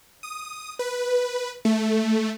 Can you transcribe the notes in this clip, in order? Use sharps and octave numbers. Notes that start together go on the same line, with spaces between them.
D#6
B4
A3